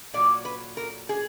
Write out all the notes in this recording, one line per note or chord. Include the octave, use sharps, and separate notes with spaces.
A#2 F#3 D5
B4
A#4
G#4